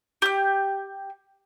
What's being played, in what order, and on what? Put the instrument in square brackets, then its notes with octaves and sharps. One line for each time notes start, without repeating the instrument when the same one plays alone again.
[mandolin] G4 G6